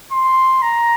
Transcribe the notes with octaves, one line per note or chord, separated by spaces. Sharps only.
C6
A#5